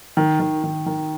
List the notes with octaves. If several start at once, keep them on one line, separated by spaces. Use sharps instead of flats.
D#3
D#3
D#3
D#3